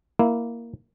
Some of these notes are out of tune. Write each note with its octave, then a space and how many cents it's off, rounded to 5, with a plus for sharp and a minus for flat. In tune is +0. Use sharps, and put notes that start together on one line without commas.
A#3 +0 E4 +0